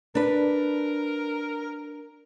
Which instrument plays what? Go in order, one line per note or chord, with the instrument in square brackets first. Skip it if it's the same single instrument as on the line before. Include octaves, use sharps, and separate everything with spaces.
[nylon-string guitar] D4 B4 [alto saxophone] A#4